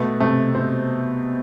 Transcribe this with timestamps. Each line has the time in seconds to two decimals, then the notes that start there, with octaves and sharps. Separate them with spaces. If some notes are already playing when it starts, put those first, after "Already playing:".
Already playing: B2 A3 B3
0.20 C3 A3 C4
0.55 C3 C4 C5